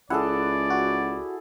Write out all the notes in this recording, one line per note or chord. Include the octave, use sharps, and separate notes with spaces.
C#2 E4 G#4 A4 D5 F#5
F#4